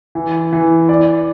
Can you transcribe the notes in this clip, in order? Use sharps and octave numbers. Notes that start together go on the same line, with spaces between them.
E3
E3
D5